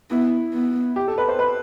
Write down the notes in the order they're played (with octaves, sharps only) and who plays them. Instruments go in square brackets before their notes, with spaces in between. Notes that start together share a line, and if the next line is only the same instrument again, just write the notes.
[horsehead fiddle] B3 [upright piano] E4
[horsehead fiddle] B3
[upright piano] G4
A4
B4
C5
B4